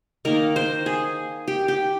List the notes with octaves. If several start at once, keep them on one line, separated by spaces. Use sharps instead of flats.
D#3 A#3 A#4
C5
G#4
G4
G4